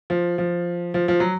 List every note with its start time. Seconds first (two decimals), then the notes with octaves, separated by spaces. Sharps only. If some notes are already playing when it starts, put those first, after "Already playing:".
0.10 F3
0.38 F3
0.94 F3
1.08 F3
1.20 F#3